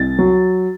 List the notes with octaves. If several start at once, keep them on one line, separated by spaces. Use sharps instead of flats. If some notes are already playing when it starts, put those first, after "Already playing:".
Already playing: C2 A6
F#3